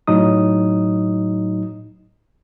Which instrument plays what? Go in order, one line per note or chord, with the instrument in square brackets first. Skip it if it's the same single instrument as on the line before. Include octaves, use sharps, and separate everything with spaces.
[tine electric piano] A2 F#3 D#4 D#6